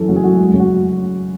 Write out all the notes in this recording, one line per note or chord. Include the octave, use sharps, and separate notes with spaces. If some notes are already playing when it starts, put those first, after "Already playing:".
Already playing: F#2 E3 A4
C#3 F#4
G#4
F#2 F#4
G#3
C#3
F#4